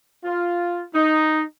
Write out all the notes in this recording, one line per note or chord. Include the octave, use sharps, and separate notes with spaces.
F4
D#4